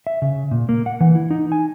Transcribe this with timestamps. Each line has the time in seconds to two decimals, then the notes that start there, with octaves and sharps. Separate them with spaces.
0.07 E5
0.22 C#3
0.51 A#2
0.69 A#3
0.86 F#5
1.01 E3
1.15 E4
1.31 D#4
1.52 G#5